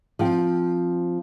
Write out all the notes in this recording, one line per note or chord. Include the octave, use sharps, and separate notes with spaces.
F3 C4 G5